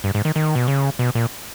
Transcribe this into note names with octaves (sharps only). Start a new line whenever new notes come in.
G2
G#2
D#3
D#3
B2
C#3
B2
A#2